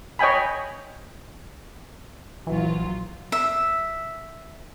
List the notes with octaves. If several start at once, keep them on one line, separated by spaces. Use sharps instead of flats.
C#5 D#5 G5 G#5 B5
A#1 E3 F#3 F4
E5